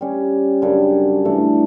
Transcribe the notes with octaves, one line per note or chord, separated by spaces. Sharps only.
G3 C#4 G4
F#2 C#3 G3 D4
G2 E3 A3 D4